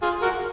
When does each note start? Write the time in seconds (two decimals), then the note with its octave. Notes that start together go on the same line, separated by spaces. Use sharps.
0.02 F4 G#4
0.22 F#4 A#4